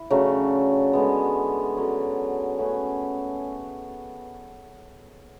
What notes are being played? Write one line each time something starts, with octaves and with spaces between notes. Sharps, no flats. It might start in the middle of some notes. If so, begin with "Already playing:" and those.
Already playing: E4
C#3 F#3 A3 D4
D3 G#3 B3
D3 F#3 C#4
A3 C#4 G#4 B4